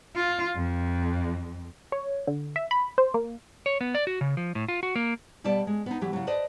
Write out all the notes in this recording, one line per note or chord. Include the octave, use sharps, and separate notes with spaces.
F4
F2
C#5
D3
E5
B5
C5
A#3
C#5
B3
D5
F#4
C#3
F3
A2
F4
F#4
A#3
B2 G3 B3 D5 A5
G#3
B3 D#4
E3 F#3 G4
C#3 F#3
B4 C5 D5 D#5 A5